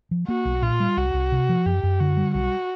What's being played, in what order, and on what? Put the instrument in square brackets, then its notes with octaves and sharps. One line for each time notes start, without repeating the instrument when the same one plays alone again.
[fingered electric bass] F3
[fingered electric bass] A#3 [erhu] F#4
[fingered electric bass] B1
[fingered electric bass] A#2 [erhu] F4
[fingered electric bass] G3
[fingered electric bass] C2 [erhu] F#4
[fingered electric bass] C2
C3
F3
[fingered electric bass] F#2 [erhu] G4
[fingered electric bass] F#2
[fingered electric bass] D3 [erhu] F#4
[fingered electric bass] G3
[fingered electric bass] B1 [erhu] F#4